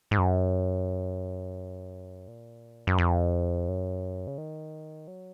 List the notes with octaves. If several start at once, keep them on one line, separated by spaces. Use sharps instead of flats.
G#2
F#2
A#2
F#2
F2
F#2
C#3
D#3
F#3